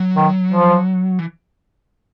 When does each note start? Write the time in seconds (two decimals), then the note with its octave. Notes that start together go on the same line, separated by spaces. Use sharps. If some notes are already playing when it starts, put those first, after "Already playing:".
Already playing: F#3
0.16 D#3
0.53 F3
1.19 E3